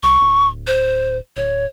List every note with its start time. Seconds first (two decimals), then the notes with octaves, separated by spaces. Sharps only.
0.03 C2 C#6
0.21 D1
0.67 C5
1.37 D1 C#5